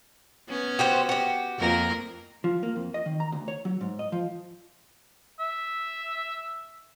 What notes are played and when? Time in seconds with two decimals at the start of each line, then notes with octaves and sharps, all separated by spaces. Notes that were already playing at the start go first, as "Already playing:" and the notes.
0.49 B3 C#4
0.79 F#4 G4 C5
1.09 F#4 G4
1.59 F2 A#3 A#4
2.44 F3
2.63 A#3
2.76 F2
2.94 D#5
3.06 D#3
3.20 A#5
3.32 D2
3.48 C#5
3.65 F#3
3.81 G#2
3.99 D#5
4.12 F3
5.40 E5